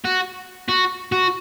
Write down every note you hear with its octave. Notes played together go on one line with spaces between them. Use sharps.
F#4
F#4
F#4